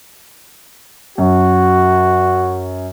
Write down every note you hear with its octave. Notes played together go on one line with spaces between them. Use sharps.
F#2 F#4